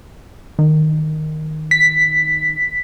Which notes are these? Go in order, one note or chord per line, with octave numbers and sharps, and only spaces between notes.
D#3
B6